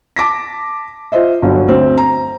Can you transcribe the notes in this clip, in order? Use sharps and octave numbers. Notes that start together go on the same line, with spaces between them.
A5 D6 A#6 B6
F4 C5 D#5 E5
G1 F#3
D2 C4
A#5